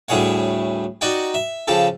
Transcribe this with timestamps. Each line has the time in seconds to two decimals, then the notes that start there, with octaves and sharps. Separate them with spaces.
0.09 D2 A2 G3 G#4 C#5 F#5
1.01 D#4 F#4 D5 D#5 F#5 G5
1.34 E5
1.68 C#3 F3 G4 A4